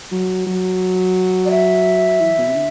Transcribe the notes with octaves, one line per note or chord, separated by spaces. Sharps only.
F#3
F#3
D5
E5
E3
B2
C3
D3